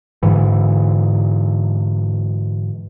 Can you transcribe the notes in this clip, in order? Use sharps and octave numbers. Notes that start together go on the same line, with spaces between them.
G#2 D3 E3